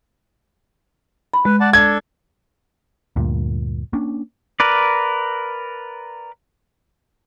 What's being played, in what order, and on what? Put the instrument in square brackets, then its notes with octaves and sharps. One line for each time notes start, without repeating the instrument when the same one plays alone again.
[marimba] B5
[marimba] G#3 [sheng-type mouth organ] B4
[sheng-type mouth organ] D5 F#5 A5
[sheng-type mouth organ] D4 A4 [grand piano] G#6
[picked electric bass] D2 G2 A#2
A#3 C#4 D4
[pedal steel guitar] A#4 B4 D5